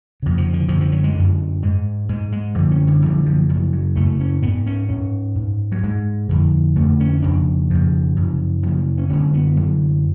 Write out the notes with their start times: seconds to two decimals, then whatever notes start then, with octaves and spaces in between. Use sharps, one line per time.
0.23 F2 C#3
0.38 F3
0.53 D3
0.68 F#2 D3 F3
0.81 F3
0.92 F#3
1.04 G#3
1.15 F#2 D3
1.62 G#2 G#3
2.09 G#2 G#3
2.32 G#3
2.55 F#2 D3 F3
2.71 C#4
2.87 D3
3.02 F#2 D3 F3
3.26 F3
3.49 F#2 C#3 F3
3.73 F#3
3.96 F#2 C#3 A3
4.20 C#4
4.43 G#2 B3
4.67 C#4
4.89 G#2 C#4
5.35 G#2
5.72 F#3
5.83 G#2 G#3
6.29 F2 D3
6.76 F2 D3 A3
7.00 C#4
7.22 F2 C#3 D4
7.70 F2 C#3 F3
8.16 F#2 C#3
8.63 F#2 C#3 F3
8.98 C#4
9.10 F#2 D3 C#4
9.34 B3
9.57 F#2 D3 F#3